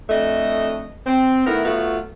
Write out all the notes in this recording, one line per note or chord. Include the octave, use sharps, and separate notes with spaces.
F2 A3 D4 D#5
C4
D#3 A3 B3 E4 A#4
F#3 A3 B3 F4